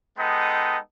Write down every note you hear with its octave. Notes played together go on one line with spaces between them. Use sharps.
G#3 B3 D#4 A4 D#5 G5